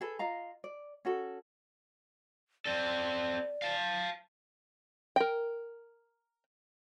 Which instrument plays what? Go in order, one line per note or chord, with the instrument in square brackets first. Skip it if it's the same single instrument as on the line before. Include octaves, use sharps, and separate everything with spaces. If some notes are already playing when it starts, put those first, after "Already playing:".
[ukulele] G#4 A4 B4
F4 D#5 F5 A#5
D5
C#4 F#4 A4
[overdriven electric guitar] C4 A4 [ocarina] D5
[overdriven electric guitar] F5 A5
[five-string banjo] A#4 G5